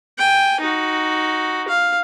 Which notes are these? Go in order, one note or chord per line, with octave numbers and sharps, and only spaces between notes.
G5 G#5
D#4 F#4
F5